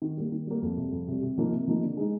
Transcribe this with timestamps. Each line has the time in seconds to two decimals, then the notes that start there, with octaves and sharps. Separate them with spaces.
0.02 D#3
0.17 G3 A#3
0.32 D#3
0.47 G3 A#3
0.62 F2
0.77 C3 G3
0.92 F2
1.08 C3 G3
1.22 C3
1.38 F3 A#3 D#4
1.52 C3
1.67 F3 A#3 D#4
1.83 D3
1.97 G#3 D#4